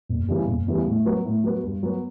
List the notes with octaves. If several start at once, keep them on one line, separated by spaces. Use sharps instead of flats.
F#1
E2 C#3 E3 G3
F#1
E2 C#3 E3 G3
A2
F#3 B3 F#4
A2
F#3 B3 F#4
G2
F#3 B3